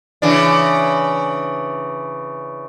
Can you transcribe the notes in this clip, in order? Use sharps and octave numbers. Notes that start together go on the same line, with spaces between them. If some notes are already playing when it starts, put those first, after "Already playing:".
C#3 E3 D4